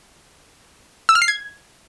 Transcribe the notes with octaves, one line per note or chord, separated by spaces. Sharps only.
E6
F6
C7
G#6